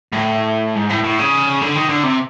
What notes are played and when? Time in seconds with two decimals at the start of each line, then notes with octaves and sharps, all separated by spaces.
0.13 A2
0.76 G#2
0.90 A2
1.04 A2
1.19 C#3
1.61 D3
1.75 D#3
1.89 D3
2.03 C3